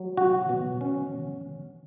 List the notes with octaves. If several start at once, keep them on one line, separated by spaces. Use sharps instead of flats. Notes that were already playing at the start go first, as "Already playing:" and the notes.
Already playing: F#3
F#4
B2
C#4